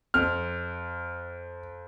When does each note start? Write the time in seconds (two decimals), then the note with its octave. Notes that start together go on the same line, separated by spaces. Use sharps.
0.14 F2 F6